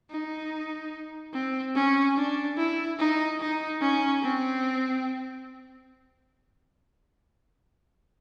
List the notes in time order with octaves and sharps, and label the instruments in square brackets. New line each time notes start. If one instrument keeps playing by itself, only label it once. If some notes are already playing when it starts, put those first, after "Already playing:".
[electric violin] D#4
C4
C#4
D4
E4
D#4
D#4
C#4
C4